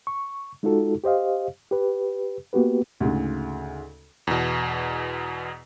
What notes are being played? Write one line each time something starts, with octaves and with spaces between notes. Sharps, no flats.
C#6
G#3 D#4 F4 F#4 A4
G4 C5 D#5 F5
G4 B4
A#3 B3 F#4 G4 B4
D2 G#2 C#3
E2 B2